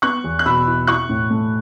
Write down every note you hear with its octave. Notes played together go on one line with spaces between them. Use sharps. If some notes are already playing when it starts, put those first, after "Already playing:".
B3 C#6 F#6
E2
F#6
B2 B5 E6
E4
E4 C#6 F#6
A2
A3